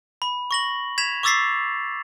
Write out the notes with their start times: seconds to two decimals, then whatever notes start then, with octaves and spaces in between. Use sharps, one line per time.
0.22 B5
0.51 C#6 A#6 F#7
0.98 G#6 B6 E7 F7
1.23 C#6 D6 E6 A6 B6 C7